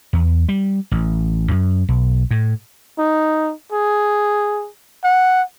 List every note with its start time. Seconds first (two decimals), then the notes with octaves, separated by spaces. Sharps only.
0.13 E2
0.49 G3
0.91 A1
1.51 F#2
1.89 B1
2.31 A2
2.98 D#4
3.72 G#4
5.04 F#5